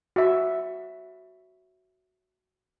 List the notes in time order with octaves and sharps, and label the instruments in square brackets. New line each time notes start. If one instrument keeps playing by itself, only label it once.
[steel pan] F#4 E5